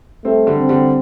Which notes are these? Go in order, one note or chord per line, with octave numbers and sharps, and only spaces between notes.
G3 A3 C4
D3 G3
C4
D3 G3